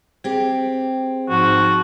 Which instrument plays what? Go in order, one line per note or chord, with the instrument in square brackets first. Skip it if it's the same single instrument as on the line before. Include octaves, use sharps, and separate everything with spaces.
[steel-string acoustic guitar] C4 G4 [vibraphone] G#4
[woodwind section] G#2 F3 [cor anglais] F#4